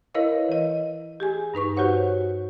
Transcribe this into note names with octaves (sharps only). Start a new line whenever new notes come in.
E4 A#4 B4 C#5 D#5 F5
E3 D#5
G4 G#4 G#5
G2 D#4 B4 C#6
F#4 G4 C5 C#5 F#5